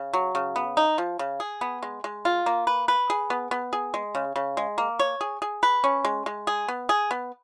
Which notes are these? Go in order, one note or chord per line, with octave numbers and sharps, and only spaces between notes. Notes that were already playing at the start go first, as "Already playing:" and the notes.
Already playing: C#3
F#3
C#3
B3
D#4
F3
C#3
G#4
B3
G#3
G#3
F4
A#3
B4
B4
G#4
B3
B3
G#4
G#3
C#3
C#3
G#3
A#3
C#5
G#4
G#4
B4
C#4
G#3
G#3
G#4
B3
G#4
B3